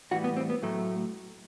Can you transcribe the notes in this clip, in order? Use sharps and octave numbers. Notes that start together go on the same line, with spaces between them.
A2 E3 G3 F#4
B3
C4
B3
A2 F#3 A3